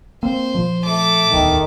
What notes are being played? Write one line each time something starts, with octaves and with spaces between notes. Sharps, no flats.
A#3 C4 C5
A#2 F3
A3 D6
D1 E2 D#3 E3